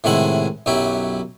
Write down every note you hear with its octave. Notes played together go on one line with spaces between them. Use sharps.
A2 C3 D#3 G#3 E4 F#5
B1 F#2 F#3 E4 G4